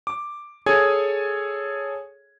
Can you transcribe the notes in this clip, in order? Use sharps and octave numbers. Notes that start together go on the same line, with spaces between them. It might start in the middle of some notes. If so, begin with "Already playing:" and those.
D6
G#4 A4 C#5 G#5 D#6 G#6